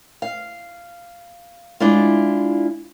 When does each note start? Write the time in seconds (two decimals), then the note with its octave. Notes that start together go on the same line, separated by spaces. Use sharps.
0.22 F5
1.80 G#3 D4 E4 F4